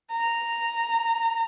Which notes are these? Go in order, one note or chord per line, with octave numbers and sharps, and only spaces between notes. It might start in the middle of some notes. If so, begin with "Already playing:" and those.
A#5